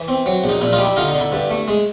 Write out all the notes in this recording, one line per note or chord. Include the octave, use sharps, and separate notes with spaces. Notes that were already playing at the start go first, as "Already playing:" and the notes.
Already playing: E3
C4
F#3
A#1
D#4
A#2 E4
D#4 F4
G3
E4
D3 D#4 F4
D#4
D3
E4
G2
A3
G#3